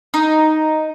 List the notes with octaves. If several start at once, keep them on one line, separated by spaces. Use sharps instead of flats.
D#4